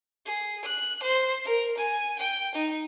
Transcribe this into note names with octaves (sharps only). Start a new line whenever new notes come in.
G#4
F#6
C5
A#4
G#5
G5
D#4